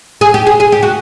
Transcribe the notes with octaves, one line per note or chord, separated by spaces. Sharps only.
G#4
G4
G#4
G#4
G4
F#4